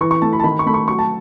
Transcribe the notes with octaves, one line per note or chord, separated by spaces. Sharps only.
E3 C#6
C#6
A3 A5
B5
A5
D#3 B5
C#6
A3 B5
C#6
F#3 C#6
A5